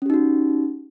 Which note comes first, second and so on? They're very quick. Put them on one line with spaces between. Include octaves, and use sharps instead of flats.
C#4 G4 D#4 F#4